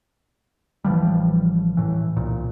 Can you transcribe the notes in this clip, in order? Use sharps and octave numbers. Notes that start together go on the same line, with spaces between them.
A1 E3 F3 G3
A2 E3
C2 A#2